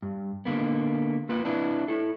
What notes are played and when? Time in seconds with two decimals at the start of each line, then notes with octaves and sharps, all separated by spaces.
0.02 G2
0.45 D3 A#3 B3
1.29 A#3 F4 B4 G5
1.44 C4 D4 E4 B4
1.88 E4 A4